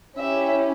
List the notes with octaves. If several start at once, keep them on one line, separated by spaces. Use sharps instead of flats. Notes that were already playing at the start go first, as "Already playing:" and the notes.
C#4 E4 G4 E5